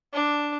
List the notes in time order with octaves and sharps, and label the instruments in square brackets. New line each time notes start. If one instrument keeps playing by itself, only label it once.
[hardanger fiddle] D4